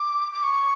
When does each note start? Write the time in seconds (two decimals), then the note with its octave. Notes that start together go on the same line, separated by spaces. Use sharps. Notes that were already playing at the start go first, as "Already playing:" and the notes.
Already playing: D6
0.33 D6
0.43 C#6